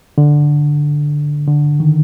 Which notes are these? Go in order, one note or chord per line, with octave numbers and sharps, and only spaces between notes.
D3
D3
D#3